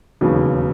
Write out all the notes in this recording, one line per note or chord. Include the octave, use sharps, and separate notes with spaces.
E1 D#2 C#3 F#3 B3